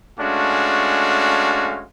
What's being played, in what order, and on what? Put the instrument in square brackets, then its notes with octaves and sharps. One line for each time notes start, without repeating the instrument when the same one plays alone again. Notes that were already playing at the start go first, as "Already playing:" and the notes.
[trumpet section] G#3 A3 C#4 D4 F#4 F5